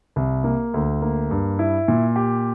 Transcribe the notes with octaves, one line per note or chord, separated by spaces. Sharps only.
C2
A#3
D2
A#3
G2
E4
A#2
G4